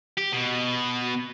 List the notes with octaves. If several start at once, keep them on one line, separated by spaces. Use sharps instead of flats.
G4
B2